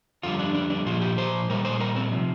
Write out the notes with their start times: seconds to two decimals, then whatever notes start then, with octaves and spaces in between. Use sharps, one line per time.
0.23 F2 D3 G3 F4
0.39 D4
0.55 D4
0.70 D4
0.86 A#2 F3 F4
1.02 G4
1.18 C5
1.50 A#2 G3 A#4
1.65 C5
1.80 A#4
1.96 C4
2.12 C3 F3